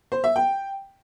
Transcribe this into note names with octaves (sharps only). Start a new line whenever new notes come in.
C5
E5
G5